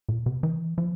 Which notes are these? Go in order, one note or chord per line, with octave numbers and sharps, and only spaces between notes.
A#2
C3
E3
F3